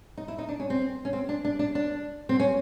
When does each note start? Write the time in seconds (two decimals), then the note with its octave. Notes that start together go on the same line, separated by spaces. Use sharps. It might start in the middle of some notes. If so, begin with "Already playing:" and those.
0.17 D#4
0.28 E4
0.38 D#4
0.49 D4
0.60 C#4
0.70 C4
1.05 C#4
1.13 C4
1.29 D4
1.45 D4
1.59 D4
1.75 D4
2.29 C4
2.40 C#4